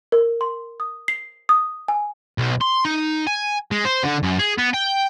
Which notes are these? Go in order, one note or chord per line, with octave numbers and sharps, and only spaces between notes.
A#4
C6
D#6
C7
D#6
G#5
B1
C6
D#4
G#5
G#3
C5
D3
F#2
G#4
B3
G5